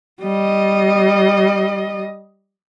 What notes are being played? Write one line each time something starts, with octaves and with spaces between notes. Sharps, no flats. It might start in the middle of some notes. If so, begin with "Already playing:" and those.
G3 D#5